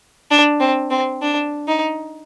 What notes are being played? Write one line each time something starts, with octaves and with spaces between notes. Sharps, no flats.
D4
C4
C4
D4
D#4